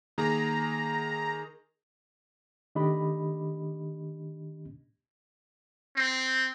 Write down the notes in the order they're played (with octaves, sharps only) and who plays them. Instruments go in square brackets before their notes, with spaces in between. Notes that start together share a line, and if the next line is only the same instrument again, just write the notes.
[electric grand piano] D#3 A#3 G#4 [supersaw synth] A#5
[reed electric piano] D#3 A3 D4 G4 D#5 B5
[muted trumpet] C4